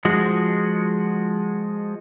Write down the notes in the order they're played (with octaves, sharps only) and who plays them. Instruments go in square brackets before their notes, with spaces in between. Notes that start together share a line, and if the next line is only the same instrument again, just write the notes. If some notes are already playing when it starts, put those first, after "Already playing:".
[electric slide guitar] F3 G#3 F#4